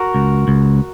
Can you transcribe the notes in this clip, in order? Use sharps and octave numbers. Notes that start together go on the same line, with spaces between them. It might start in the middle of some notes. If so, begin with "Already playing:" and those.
Already playing: F#4 A#4
C#2
C#2